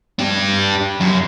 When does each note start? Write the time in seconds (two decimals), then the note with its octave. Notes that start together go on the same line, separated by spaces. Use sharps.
0.19 D4 G4
1.01 F#2